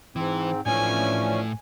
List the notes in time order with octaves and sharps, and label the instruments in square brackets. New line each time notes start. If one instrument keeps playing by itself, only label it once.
[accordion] G#2 C4 [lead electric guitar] E3
[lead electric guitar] A2 A3 [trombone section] E3 F3 D4 [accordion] C#4 [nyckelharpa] G#5